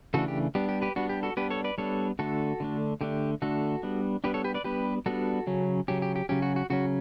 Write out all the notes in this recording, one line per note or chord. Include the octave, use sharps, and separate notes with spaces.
C#3 E3 A3 D4 F#4 A4
G4
G3 B3 D4 G4
G4
G4 B4
G3 B3 D4 F#4
G4
F#4 A4
G3 B3 D4 G4 B4
A4 C#5
B4 D5
G3 B3 D4 A4 C#5
D3 A3 D4 F#4 A4
D3 A3 D4
D3 A3 D4 G4
D3 A3 D4 F#4 A4
G3 B3 D4
G3 B3 D4 G4 B4
A4 C#5
G4 B4
B4 D5
G3 B3 D4 G4 B4
G3 B3 D4 F#4 A4
C#3 F#3 C#4
C#3 F#3 C#4 G4
G4
G4
C#3 F#3 C#4 G4
F#4
F#4
C#3 F#3 C#4 F#4